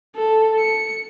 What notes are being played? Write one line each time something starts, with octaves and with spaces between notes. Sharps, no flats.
A4
C#7